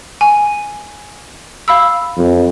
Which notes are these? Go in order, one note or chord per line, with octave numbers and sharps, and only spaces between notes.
G#5
F5 B5 E6
F2